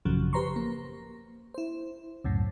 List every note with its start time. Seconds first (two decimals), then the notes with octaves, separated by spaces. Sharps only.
0.05 A1 F#2 C#3 F3 F#3
0.33 G4 B4 C5 A#5 C6 C#6
0.56 A#3
1.54 E4 C5
2.24 C#2 F#2 A2